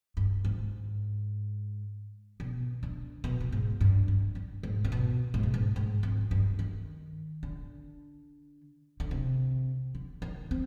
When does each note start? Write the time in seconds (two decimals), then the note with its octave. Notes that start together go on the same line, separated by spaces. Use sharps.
0.17 G2
0.45 G#2
2.40 B2
2.83 D3
3.24 B2
3.41 B2
3.52 G#2
3.81 G2
4.08 G2
4.35 G2
4.63 G#2
4.85 C3
4.92 B2
5.34 G#2
5.43 B2
5.54 G#2
5.76 G#2
6.03 F2
6.31 G2
6.59 D#3
7.43 D3
9.00 D3
9.11 C3
9.95 D3
10.22 D#3
10.51 C4